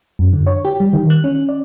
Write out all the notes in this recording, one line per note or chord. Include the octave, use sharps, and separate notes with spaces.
F#2
D3
C#5
G4
G3
D#3
F#6
C#4
D5